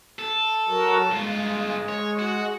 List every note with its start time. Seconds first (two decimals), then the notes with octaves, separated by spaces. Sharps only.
0.19 A4
0.69 F#3 F#4 A#4
1.11 G2 G#3 F4
1.89 C#5
2.19 F#4